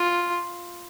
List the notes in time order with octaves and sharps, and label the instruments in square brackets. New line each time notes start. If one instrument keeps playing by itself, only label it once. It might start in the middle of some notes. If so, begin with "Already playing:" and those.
Already playing: [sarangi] F4